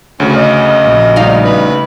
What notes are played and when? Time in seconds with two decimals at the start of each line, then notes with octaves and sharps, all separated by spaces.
0.20 D2 C#3 C#4
0.36 D#5
0.86 A#1
1.16 G3 D#4 F5
1.44 B4